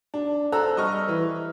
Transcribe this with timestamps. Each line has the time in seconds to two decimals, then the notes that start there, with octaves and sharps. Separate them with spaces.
0.14 D4
0.52 A4 C5 A#5 E6 F#6
0.76 G3 D#5 C#6 F6
1.08 E3